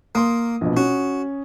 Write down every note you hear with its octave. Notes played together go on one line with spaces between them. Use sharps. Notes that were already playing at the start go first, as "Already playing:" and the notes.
A#3 C6 D#6
A#1 B2
C#4 F#4